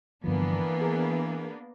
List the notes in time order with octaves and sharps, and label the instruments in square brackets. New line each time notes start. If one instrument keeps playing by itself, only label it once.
[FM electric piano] G2 D3 F3 [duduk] E3 [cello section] A#3 B3 D4
[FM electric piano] G#4 A#4